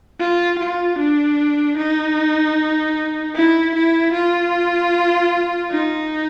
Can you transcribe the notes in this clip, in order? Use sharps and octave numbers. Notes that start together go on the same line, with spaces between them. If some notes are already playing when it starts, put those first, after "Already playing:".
F4
F4
D4
D#4
E4
E4
F4
D#4